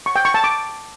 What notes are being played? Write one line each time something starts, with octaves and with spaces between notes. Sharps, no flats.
C#6
G5
C#6
A5
D6